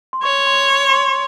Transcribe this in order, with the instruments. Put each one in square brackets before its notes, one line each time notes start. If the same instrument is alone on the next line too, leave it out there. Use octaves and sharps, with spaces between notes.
[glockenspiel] C6
[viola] C#5 [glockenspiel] C#6
[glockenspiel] C6
C6
C#6